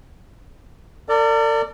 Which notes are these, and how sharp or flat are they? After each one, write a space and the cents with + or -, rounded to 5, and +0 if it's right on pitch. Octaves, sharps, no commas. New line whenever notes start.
A#4 -45 D5 +0